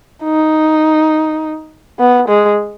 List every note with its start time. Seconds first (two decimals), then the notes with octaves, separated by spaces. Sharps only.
0.24 D#4
1.99 B3
2.28 G#3